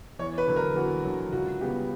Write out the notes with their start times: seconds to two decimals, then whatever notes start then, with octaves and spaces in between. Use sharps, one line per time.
0.19 E2 C#5
0.38 B4
0.48 D3 F#3
0.56 A#4
0.76 E2 F#4
1.04 D3 F#3
1.32 C#2 F#4
1.61 C#3 G3 B3 G4